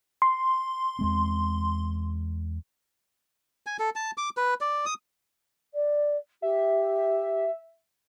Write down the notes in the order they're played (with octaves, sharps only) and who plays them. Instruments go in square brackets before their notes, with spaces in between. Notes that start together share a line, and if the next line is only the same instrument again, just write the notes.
[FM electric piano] C6
[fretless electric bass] E2 G#3 C4
[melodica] G#5
A4
A5
D6
B4
D5
D#6
[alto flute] D5
[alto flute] G4 [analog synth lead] E5